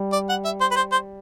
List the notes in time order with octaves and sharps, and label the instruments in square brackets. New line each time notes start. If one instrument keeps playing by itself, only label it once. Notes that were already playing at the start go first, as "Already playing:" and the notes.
Already playing: [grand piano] G3
[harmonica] D5
F#5
E5
C5
B4
C5
C5